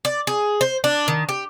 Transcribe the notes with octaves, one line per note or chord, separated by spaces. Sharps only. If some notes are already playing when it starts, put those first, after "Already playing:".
D5
G#4
C5
D4
D#3
G4